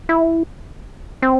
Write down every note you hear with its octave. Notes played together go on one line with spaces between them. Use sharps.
E4
C4